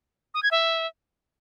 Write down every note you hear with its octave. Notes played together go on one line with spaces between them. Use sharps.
D#6
G#6
E5